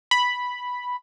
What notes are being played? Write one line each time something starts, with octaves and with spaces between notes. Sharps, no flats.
B5